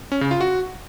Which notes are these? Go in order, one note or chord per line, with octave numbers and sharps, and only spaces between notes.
C#4
C#3
F4
F#4